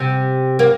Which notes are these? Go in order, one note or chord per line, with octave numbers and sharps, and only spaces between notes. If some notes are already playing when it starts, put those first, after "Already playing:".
Already playing: C3
A#3